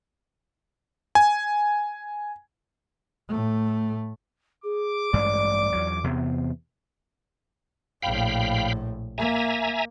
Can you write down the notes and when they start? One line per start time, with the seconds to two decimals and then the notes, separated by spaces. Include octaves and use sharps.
1.15 G#5
3.29 A2 A3
4.64 G#4 D6
5.13 A1 G2 G#3 D5
5.73 E2 F#3
6.04 E2 C3 B3
8.02 A#1 A2 F5 G5 B5
9.18 A#3 E5 G#5 A#5